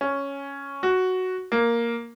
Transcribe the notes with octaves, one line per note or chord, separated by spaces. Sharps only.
C#4
F#4
A#3